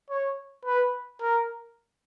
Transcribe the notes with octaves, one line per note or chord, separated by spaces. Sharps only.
C#5
B4
A#4